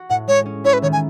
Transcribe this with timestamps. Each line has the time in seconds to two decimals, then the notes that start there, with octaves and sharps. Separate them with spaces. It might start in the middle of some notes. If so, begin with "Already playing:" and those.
Already playing: F#4
0.10 A2 F#5
0.28 G#3 C#5
0.46 C#4
0.64 E4 C#5
0.73 B4
0.82 D#3 C#5
0.92 G#5